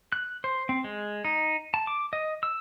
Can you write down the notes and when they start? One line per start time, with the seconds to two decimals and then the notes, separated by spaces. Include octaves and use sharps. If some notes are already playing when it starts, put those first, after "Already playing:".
0.12 F#6
0.44 C5
0.69 C4
0.84 G#3
1.25 D#4
1.74 A5
1.87 D6
2.13 D#5
2.43 E6